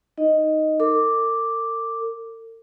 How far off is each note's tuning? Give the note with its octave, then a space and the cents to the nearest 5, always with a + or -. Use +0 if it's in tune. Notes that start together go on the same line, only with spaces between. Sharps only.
D#4 +0 D#5 +0
A#4 -45 D6 +0